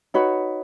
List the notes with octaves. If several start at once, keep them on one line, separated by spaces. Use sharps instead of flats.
D#4 F#4 B4 C#5